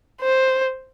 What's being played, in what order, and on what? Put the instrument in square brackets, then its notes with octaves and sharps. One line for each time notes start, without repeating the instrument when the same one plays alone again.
[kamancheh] C5